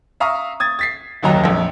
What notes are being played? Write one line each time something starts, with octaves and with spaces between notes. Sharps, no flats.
E5 F5 A#5 C#6 D#6
D#6 G#6 A6
A6 B6 C7
F#1 D#2 F#3 D#5 A#5
A#1 F2